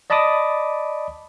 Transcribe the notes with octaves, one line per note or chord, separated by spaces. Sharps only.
D5 D#5 A5 B5 D6 D#6